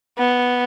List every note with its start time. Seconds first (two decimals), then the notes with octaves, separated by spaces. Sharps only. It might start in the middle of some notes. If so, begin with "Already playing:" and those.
0.18 B3